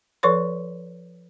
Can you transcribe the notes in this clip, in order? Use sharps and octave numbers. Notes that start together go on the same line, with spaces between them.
F3 A4 B4 C#5 C6